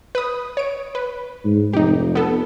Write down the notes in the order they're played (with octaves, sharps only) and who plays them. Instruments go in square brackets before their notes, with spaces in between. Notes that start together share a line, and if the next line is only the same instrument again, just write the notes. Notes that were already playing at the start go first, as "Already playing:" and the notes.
[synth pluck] B4 D#6
C#5 D7
B4
[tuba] G#2
[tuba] F1 [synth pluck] D#4 G4
[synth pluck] B3 A4